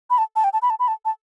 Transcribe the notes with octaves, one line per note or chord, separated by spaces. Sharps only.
B5
A5
A5
G5
A5
B5
A5
B5
A5
A5